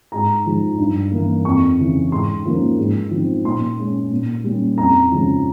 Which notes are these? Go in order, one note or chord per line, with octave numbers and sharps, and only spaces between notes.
G#2 A#5
F3 G#3
G2
E3 A#3
F2 C#6
C#3 E3
G#2 C6
F3 A#3 C#4
G#2
F3 C4
A#2 C6
G#3 C#4
A#2
G3 A#3 C#4
F2 A#5
C#3 F3 G#3 C#4